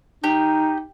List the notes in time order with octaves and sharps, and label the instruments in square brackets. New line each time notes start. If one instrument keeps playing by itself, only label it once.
[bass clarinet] D#4 [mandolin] G4